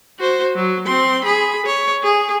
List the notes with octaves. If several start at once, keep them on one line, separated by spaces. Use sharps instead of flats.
F#4 C5
F#3
C4 C6
G#4 B5
C#5
G#4